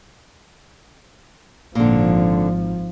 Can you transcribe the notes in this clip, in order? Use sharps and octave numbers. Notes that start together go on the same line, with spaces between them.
G#1 A#2 D3 F3